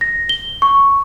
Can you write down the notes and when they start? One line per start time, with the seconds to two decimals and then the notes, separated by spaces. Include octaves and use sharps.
0.01 A#6
0.29 G7
0.62 C#6